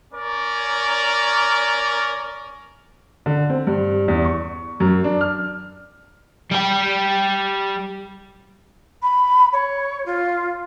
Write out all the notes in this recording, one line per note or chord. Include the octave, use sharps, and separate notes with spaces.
C#4 A#4 D5
D3
C4
G2
E2
C#6
F#2
D4
F6
G3 G5
B5
C#5
F4